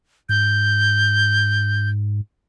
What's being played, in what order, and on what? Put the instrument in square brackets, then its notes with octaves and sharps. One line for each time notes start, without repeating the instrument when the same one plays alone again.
[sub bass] G#2 [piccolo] G6